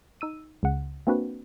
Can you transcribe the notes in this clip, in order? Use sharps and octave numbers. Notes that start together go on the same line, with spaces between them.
D#4 E6 D#7
C#2 C#3 F#5
A#3 C4 D4 F#4 B4